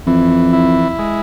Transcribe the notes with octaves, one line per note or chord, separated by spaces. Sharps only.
F2 E3
E4
G#3